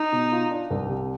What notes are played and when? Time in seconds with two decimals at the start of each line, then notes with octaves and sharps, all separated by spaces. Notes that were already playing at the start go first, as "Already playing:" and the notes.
Already playing: D#4
0.12 B2
0.32 F4
0.51 D4
0.71 C2
0.89 C3